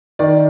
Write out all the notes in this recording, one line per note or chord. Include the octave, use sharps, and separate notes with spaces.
D#3 D5